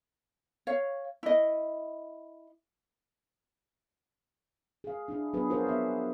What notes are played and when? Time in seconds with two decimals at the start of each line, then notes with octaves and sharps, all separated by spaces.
0.67 C#5 F5
1.23 E4 D#5
4.84 G#4 F5
5.08 D4 E4 G#4
5.33 F#3 B3 D4 G#4 B4
5.50 F4 F#4 G#4 A#4 C5
5.67 B3 E5